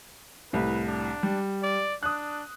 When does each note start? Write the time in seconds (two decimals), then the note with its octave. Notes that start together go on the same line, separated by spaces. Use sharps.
0.53 C2 A2 B4
0.86 D4
1.23 G3
1.63 D5
2.03 D4 D#6 F#6